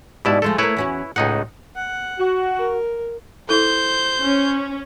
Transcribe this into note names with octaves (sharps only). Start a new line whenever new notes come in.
G#2 B2 E4 G4 D5 A5
F3 G#3 A3 A4
A3 A#3 E4 B4 C#5
E2 C#4 F#4
C#2 A2 D#4 D#5 F#5
F#5
F#4
A#4
E4 A4 C5 G6
C#4